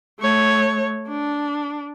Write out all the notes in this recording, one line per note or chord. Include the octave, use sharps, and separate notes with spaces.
A3 C#5
D4